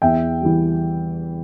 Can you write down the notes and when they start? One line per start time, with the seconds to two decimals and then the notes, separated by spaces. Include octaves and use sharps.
0.02 E2 E5 G5
0.41 E3 G3